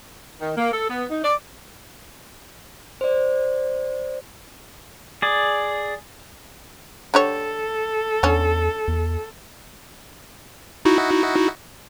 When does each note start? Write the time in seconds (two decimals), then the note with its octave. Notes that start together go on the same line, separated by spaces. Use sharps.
0.39 D#3
0.56 A#3
0.72 A4
0.87 B3
1.09 D#4
1.22 D5
3.01 C5 D5
5.22 G#4 D5
7.14 D3 G4 A4 C#5
8.23 E2 D3 C#4
8.88 E2
10.85 D#4 E4 F#4